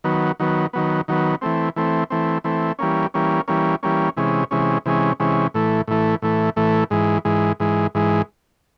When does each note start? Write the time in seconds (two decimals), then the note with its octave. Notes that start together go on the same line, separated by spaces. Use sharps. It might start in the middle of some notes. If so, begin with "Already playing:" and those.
0.04 D#3 F#3 B3
0.40 D#3 F#3 B3
0.73 D#3 F#3 B3
1.08 D#3 F#3 B3
1.41 E3 A3 C4
1.76 E3 A3 C4
2.10 E3 A3 C4
2.44 E3 A3 C4
2.79 E3 G3 A#3 C#4
3.14 E3 G3 A#3 C#4
3.48 E3 G3 A#3 C#4
3.83 E3 G3 A#3 C#4
4.17 C3 E3 G#3 C#4
4.51 C3 E3 G#3 C#4
4.86 C3 E3 G#3 C#4
5.20 C3 E3 G#3 C#4
5.54 A2 E3 A3
5.88 A2 E3 A3
6.22 A2 E3 A3
6.56 A2 E3 A3
6.90 G#2 E3 G#3
7.25 G#2 E3 G#3
7.60 G#2 E3 G#3
7.95 G#2 E3 G#3